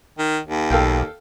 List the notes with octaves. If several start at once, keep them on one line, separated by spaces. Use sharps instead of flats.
D#3
D#2
B1 A4 F5 G5